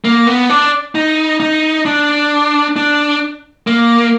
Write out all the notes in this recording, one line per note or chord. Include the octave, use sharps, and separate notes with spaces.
A#3
B3
D4
D#4
D#4
D4
D4
A#3